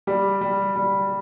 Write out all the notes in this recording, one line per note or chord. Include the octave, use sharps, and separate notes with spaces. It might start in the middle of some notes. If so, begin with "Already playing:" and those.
G3 G4
G3
G3